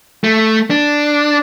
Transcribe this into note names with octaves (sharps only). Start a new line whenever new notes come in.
A3
D4